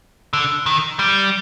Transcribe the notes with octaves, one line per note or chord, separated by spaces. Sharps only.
D3
D#3
G3